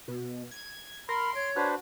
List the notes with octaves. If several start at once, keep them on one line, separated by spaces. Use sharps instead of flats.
B2
G#6
A#4 B5 C6
C#5 D7
D4 F#4 B4 C5